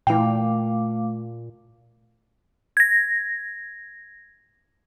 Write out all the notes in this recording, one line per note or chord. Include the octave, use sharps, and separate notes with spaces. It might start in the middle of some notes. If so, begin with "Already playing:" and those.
A#2 E3 A3 F5 G5 D6
G#6 A#6